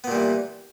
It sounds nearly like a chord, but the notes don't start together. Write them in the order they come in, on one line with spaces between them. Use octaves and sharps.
B3 A#2 G3 E3